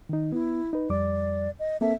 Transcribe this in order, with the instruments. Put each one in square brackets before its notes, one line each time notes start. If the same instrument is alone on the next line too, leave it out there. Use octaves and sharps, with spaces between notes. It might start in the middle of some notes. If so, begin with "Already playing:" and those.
[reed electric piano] D#3 D#4
[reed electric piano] B3 [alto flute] E4
[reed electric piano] D#4 B4
[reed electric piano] F2 G3 D6 [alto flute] D5
[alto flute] D#5
[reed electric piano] A#3 C4 A4 [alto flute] E5